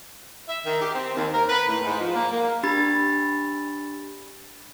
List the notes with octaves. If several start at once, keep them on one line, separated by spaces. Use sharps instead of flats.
E5
D#3
G4
C4
D#2
A#4
B4
A2
G#2
F3
A#3
A#3
D4 G4 B5 A6